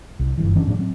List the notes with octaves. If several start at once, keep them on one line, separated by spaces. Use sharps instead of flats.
C2
F#1 G2 E3
E3 C#4 D4
A2 F3 D4
F#3 C4